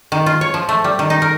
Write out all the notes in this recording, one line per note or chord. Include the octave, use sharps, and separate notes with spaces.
D#3
F4
C#5
F3
A3
G3
D#3
D#4
A#4